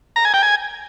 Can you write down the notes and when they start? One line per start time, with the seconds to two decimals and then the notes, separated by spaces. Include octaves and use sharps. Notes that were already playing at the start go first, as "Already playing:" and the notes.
0.16 A#5
0.25 G#5
0.34 G5
0.43 G#5